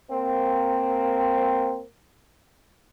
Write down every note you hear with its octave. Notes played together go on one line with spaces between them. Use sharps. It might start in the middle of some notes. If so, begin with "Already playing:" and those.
A#3 C4